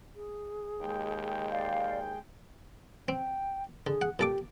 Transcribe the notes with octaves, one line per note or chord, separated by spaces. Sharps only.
G#4
D#2 G#3 G5
D5 F5
C4 G5
D3 G#4
F#5
A#2 G4 A4 D6